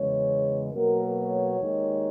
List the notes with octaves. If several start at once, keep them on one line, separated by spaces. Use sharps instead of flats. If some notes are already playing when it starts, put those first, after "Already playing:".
Already playing: E2 C#3 G#3 C#5
B2 F#3 A#3 A#4
C#5
D#2 D#3 G#3